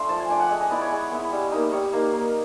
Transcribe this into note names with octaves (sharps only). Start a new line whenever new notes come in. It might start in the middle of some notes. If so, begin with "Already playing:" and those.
Already playing: A3 D4 F4 C6
F3 A5
G#5
A3 D4 G5
F#5
G#3 G#5
D#5
B3 E4 D5
C#5
G#3
B3 E4
G3
A#3 D#4
G3 C#5
A#3 D#4 F5
A#3